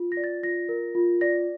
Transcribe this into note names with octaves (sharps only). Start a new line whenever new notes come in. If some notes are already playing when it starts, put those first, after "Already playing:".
Already playing: F4
A#6
D5
A6
F4 A#6
A#4
F4
D5 A#6